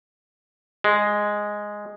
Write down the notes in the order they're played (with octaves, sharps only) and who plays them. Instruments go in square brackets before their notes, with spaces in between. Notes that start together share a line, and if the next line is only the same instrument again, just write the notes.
[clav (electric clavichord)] G#3